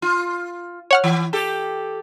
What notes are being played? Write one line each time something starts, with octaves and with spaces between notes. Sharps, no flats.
F4
C#5 F#5 F6
E3
G4 A4